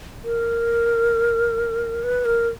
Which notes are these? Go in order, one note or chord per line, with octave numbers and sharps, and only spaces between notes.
A#4
B4
A#4